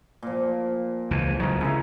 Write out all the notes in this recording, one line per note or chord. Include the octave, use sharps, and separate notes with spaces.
A#2 F3
C#2 E3
C#2 F#3 D#4
C#3 E4 A#4